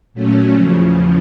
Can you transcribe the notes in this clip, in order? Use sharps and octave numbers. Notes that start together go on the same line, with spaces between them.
A#2 F#3 A3 C#4
E2 C#3 F3